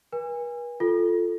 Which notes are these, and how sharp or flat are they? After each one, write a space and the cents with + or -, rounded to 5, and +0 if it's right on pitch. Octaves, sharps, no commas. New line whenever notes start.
B4 -45 G#5 -30
F4 +0 A4 +0